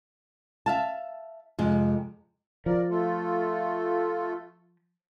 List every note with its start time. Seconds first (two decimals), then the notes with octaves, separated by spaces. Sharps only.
0.66 E5 F5 A5
1.59 F2 C3 G#3
2.66 F3 A#4 D5
2.91 A3 F4 A4